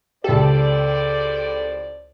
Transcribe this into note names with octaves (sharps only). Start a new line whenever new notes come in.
C#2 A2 G4 A4 C5 D5